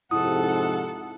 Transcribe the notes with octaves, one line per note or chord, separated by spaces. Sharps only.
F2 G#2 C3 E4 A4 F#5 D#6